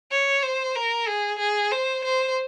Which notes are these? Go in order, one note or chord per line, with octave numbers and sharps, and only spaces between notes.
C#5
C5
A#4
G#4
G#4
C5
C5